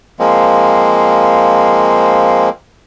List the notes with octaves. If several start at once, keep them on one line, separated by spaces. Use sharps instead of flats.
F3 G#3 A#3 C4